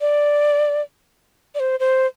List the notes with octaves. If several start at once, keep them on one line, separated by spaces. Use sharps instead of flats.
D5
D5
C5
C5